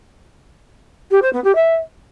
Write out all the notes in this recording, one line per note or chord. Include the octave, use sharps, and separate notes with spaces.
G4
C5
B3
G4
E5